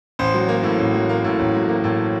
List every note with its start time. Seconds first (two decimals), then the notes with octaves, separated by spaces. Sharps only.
0.19 A1 C5
0.34 F#3
0.48 A#3
0.63 A2
0.79 A1
0.94 F#3
1.09 A#3
1.24 A2
1.39 A1
1.54 F#3
1.69 A#3
1.84 A2